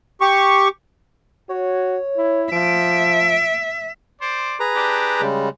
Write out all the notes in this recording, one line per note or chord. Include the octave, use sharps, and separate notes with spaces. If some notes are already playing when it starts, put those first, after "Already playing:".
G4 C#6
F#4 C#5
E4
F3 E5 D7
C5 D5
G#4 B4 A#5
D4 G4
C#3 G3 G#3